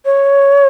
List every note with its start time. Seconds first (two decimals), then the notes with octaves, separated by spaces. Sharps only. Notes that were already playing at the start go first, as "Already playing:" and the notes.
0.05 C#5